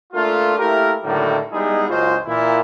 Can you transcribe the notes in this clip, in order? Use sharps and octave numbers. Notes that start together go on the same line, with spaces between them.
A3 A#3 D4 F4
A3 A#3 E4 G4 A#4
A2 D3 D#3 F#3 G3 A#3
G3 G#3 B3 D#4 E4 G#4
F#1 C#2 G#3 F4 F#4 C5
A#2 E3 E4